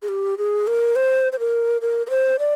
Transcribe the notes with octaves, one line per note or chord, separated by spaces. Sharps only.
G#4
G4
G#4
A#4
C5
C5
A#4
A#4
A#4
C5
D5